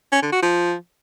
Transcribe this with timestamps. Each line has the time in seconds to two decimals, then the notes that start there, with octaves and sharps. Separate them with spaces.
0.12 C#4
0.22 D3
0.32 F#4
0.42 F3